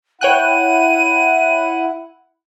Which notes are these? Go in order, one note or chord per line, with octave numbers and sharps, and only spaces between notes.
E4 C#5 F#5 G5 F#6 D#7